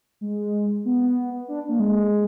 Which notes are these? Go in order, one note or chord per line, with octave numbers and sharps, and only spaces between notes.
G#3
B3
D4
A#3
G#3